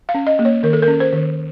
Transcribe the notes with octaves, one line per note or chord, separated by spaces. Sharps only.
F5
C#4
D#5
A#3
C#5
D#3 A#4
A4
A#4
C#4
C5
D#3